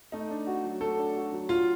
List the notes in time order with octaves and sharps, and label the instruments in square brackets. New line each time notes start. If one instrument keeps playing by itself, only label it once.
[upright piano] A3 [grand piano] D#4
[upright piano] D4
F#4
F#3
[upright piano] A3 [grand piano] A4
[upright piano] D4
F#4
F#3
[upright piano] F#3 [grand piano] F4